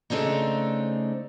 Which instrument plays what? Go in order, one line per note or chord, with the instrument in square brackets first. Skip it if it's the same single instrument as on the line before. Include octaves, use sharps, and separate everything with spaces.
[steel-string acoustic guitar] C#3 A3 C4 D4 D#4